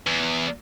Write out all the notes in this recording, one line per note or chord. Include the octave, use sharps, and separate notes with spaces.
E2